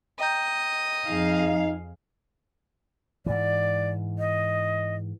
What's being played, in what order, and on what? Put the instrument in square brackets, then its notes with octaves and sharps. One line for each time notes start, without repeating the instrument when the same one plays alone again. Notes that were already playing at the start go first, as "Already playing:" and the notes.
[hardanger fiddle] D#5 [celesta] G5 A#5 G6
[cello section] F2 G#4 F5 [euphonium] D#4
[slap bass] G#2 E3 [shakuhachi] D5
[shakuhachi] D#5